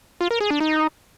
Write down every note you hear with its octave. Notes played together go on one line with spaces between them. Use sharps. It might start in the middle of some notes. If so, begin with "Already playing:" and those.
F4
A#4
G#4
D4
D#4